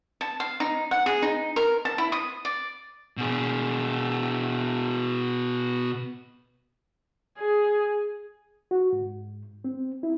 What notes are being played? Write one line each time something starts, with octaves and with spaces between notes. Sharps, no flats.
A5
F5
D#4
F#5
G#4
D#4
A#4
A5
E4
D#6
D5
B2 G#4
G#4
F#4
G#2
C4
E4